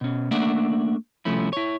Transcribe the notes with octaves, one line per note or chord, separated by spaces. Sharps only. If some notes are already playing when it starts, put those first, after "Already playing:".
B2 C#4
A3 A#3 D4 D5 E5 F#5
C2 F3 A3 C#4 E4
E4 C#5